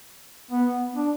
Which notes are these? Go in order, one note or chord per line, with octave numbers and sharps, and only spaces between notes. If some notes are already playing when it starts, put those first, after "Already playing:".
B3
D4